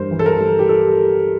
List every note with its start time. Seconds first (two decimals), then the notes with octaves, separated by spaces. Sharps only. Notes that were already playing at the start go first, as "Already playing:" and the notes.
Already playing: G2 E3 G3 A#4 C5
0.11 E3
0.19 A4
0.26 A#4
0.40 G3
0.59 G4
0.69 A4